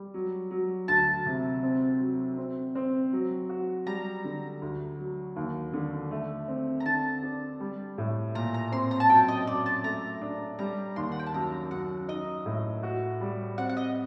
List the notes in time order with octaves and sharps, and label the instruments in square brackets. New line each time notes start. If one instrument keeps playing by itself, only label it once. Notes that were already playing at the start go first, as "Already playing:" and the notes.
Already playing: [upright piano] G3
F#3
F#3
[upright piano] D2 [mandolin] A5
[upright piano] C3
C4
F#3
C4
C4
F#3
F#4
[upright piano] G3 [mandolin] A#5
[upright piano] D3
D2
F#3
D#2
D3
A3
C4
[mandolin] A#5
[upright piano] D3 [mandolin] A5
[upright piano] D4
G3
A2
[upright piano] A#2 [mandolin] A#5
[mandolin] A#5
[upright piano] C4 [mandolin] C6
[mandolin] A#5
A5
[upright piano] F#2 [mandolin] G5
[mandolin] D#5
[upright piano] F#2 [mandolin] D5
[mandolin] A5
[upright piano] A3 [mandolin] A#5
[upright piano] D4
[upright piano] G3 [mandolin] A#5
[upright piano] D#2 [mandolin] C6
[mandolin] F#5
G5
A5
[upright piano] F#2 [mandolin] A#5
[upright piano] F#2 [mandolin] F#5
[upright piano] D#4 [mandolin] D#5
[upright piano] A2
F#4
G3
[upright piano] C4 [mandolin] F#5
[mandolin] F#5
D#5